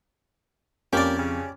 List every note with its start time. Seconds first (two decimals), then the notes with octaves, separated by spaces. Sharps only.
0.93 F2 A#3 C#4 G4 D5
1.18 C#3